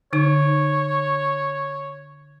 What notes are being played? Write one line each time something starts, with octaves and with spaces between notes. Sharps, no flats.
D3 D#4 C#5